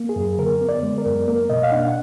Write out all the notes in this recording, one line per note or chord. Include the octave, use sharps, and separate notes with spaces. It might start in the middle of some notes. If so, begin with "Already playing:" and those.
Already playing: A#3
G#4
F#2
D3 A#4
B3
D5
G#3
A#4
F#2
A#3 A#4
B2 D#5
F5
D4 F#5
F#5